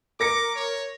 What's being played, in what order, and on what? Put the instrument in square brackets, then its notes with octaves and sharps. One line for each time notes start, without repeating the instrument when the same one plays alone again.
[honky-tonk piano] A#4 A#6 C#7 [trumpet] D6
[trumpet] C#5